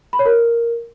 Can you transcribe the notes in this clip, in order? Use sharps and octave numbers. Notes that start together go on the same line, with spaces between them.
B5
C#5
A#4